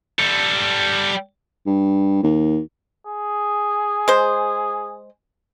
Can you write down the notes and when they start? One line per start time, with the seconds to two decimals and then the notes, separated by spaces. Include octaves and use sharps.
0.19 G3 A4
1.66 G2
2.23 D#2
3.07 G#4
4.08 G#3 C5